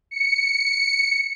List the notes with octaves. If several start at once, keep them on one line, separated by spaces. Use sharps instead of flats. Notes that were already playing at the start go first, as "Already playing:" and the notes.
C#7